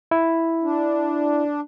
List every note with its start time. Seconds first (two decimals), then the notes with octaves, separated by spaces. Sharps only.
0.11 E4
0.63 D4